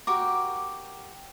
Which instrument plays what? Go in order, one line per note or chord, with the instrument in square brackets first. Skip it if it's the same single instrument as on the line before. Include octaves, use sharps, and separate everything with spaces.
[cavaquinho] F#4 G4 A#4 D6